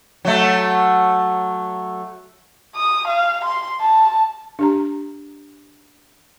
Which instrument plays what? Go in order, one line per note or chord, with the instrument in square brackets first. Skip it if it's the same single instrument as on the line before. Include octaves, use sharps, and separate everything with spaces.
[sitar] F#3 A3
[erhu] D#6
F5
C6
A5
[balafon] D4 G4 A#5